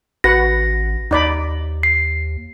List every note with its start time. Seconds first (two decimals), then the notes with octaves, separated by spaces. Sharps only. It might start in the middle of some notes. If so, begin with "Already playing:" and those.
0.24 A1 F#4 B4 F#5 A#6
1.11 D#2 D#4 D5 B5
1.83 C7